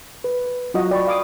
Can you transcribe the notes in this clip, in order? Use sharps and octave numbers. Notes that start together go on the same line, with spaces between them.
B4
F#3 F4 F#4 D#5
D5 G5 B5 C#6
F5 D6 D#6